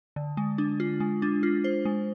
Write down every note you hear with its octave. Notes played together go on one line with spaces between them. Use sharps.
D3
G#3
D4
F4
G#3
D4
F4
C5
G#3